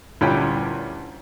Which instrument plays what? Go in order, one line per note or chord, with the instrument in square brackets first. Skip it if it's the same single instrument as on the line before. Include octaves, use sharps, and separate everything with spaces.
[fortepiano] D2 A#2 E3 G3 C#4 G5